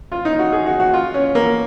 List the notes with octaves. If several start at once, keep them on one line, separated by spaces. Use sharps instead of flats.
F4
D#4
F#4
G#4
F#4
F#4
F4
C#4
A#3